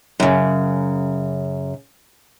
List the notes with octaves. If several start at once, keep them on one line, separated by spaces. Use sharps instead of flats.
F#2 C#3